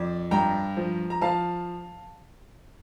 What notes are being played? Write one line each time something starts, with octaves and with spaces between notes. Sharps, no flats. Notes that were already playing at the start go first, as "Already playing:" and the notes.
Already playing: F2 D5
G2 G5 A#5
F3
A#5
F3 F5 A5